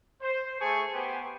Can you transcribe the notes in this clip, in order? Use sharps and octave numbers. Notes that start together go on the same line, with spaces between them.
C5
A3 G#4 G#5 A5 C#6
B3 G4 B4 C5 G5 G#5